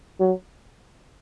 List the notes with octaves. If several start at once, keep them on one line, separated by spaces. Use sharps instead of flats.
F#3